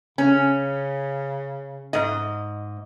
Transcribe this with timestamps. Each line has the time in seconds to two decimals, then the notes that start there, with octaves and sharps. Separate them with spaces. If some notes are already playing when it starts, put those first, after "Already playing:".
0.18 C#3 C#4
1.93 G#2 D#5